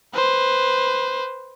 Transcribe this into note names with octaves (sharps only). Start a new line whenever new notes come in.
B4 C5